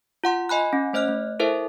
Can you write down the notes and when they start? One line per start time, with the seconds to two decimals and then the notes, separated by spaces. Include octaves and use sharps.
0.24 F4 F#5 C6
0.49 D#5 G#5 B5 F#6
0.73 C#4
0.93 A3 C5 D#5 F6 F#6
1.08 A3
1.39 E4 A4 A#4 C5 E5